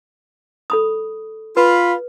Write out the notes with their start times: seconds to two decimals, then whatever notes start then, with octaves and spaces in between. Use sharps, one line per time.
0.70 A4 B5 D#6
1.57 F4 B4 B5